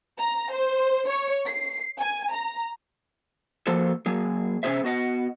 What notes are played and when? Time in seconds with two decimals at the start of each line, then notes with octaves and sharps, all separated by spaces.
0.17 A#5
0.51 C5
1.08 C#5
1.47 C7
1.99 G#5
2.32 A#5
3.67 F3 A#3 F#4 A4 C5
4.06 F#3 A#3 G#4
4.63 C3 C#4 F4 G#4 C5 E5
4.83 B3 F#4 D#5 F#5